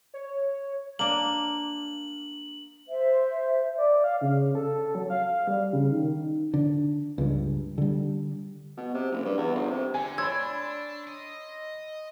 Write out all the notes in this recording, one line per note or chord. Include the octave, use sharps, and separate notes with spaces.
C#5
A#3 D4 F#7
C5 E5
D5
F5
C#3
A4
F#3
F5
G3
C#3
D#3
D3
C#2 G2
D3 G3
B2
C3
F#1
G2
E2
G1
C3
D3 G#5
D4 C#5 B5 C6 E6 G#6
D#5